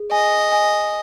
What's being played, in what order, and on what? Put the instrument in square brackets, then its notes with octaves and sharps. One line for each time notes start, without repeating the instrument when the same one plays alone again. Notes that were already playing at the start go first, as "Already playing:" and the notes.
Already playing: [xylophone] G#4
[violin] D#5 [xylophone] G#5
[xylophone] G#5